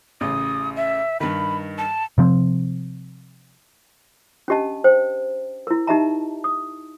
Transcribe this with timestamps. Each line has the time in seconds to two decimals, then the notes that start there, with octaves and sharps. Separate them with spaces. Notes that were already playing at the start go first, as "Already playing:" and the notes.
0.21 A1 C#3 D#6
0.76 E5
1.20 G2 D#3 B5
1.78 A5
2.18 C3 F3 C4
4.48 C#4 D4 G4 D#5 A5
4.84 C5 G5
5.67 E4 A#4
5.87 D#4 G4 D#5 E5 A5 A#5
6.44 D#6